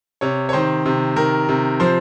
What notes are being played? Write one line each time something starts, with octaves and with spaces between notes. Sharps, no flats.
C3 C#5
C#5
D#3 C5
C3
D#3 A#4
C3
F3 C5